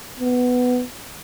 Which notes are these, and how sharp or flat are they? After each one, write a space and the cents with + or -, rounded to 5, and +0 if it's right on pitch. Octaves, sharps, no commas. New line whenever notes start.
B3 +10